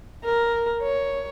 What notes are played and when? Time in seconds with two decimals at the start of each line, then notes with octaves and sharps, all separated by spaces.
0.24 A#4
0.82 C#5